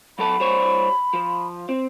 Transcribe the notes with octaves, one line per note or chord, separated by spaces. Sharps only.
F#3 A4 A5 B5
G3 C5 C#5
F3
C4